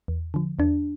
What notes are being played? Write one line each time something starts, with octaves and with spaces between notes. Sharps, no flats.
E2
D3 F3
E2 D4